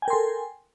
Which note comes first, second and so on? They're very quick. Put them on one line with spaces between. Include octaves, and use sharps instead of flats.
G#5 G5 A#4 C6 A4